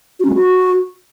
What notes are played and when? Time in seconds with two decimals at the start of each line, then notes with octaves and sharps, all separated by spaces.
0.20 F#4
0.25 C#4
0.30 G#3
0.35 F#4